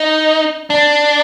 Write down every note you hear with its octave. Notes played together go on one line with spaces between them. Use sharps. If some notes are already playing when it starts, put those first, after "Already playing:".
Already playing: D#4
D4